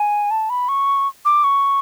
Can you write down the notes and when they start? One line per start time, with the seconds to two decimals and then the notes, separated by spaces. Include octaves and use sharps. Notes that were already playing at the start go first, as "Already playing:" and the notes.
Already playing: G#5
0.31 A5
0.50 B5
0.69 C#6
1.25 D6
1.44 C#6